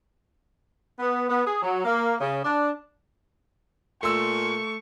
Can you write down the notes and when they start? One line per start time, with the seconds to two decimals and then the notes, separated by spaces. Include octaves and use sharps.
0.99 B3
1.29 B3
1.46 G#4
1.62 F#3
1.85 A#3
2.21 C#3
2.44 D4
4.03 A#2 A3 C6 C#6 E6